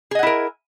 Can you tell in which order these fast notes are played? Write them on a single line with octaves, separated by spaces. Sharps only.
G#4 D#5 F#5 E4 A#4